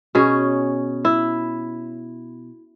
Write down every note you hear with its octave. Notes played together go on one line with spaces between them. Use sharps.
B2 C#4 G#4
E4